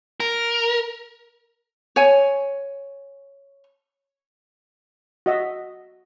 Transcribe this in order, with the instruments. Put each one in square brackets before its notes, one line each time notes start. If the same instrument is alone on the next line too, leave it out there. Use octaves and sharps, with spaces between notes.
[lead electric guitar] A#4
[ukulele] C#5 G#5
[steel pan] F#4 D#5 E5